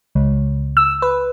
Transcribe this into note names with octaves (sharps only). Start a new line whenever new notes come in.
C#2
E6
B4